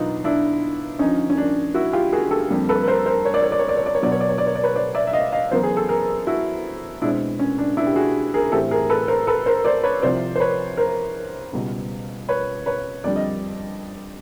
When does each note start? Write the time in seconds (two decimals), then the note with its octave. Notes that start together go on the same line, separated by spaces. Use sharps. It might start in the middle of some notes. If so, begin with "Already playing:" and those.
Already playing: E2 B2 F#3 B3 D4 D#4 F4
0.24 D4 E4
0.99 G2 D3 F3 C#4 D#4
1.30 C#4
1.38 D4
1.74 E4 F#4
1.93 F4 G4
2.13 F#4 G#4
2.31 G4 A4
2.50 F2 D3 G3 A#3
2.69 A4 B4
2.83 B4
2.88 A#4 C5
3.06 A#4 C5
3.25 C#5
3.34 D5
3.43 C#5
3.52 D5
3.59 C#5
3.69 D5
3.77 C#5
3.86 D5
3.95 C#5
4.01 B2 F#3 B3 D5
4.12 C#5
4.21 D5
4.29 C#5
4.38 D5
4.47 C#5
4.55 D5
4.64 B4 C#5
4.76 C5 D5
4.95 D5 E5
5.07 E5
5.13 D#5 F5
5.32 D#5 F5
5.51 E2 C#3 F#3 B3 A#4 C5
5.63 G#4
5.77 A4
5.89 G#4 A#4
6.27 E4 F#4
7.02 B2 G#3 C4 D4 E4
7.39 C#4
7.58 D4
7.77 D4 E4
7.87 G4
7.96 F#4 G#4
8.34 G#4 A#4
8.52 A2 E3 A3 C4 G4 A4
8.71 G#4 A#4
8.90 A4 B4
9.08 A#4 C5
9.27 A4 B4
9.46 A#4 C5
9.65 C5 D5
9.83 B4 C#5
10.02 C2 C3 F3 C5 D5
10.36 C5
10.40 B4 C#5
10.77 A#4 C5
11.53 C#2 B2 G3
12.29 B4 C#5
12.66 B4 C#5
13.04 F2 D3 G3 D5
13.16 D#5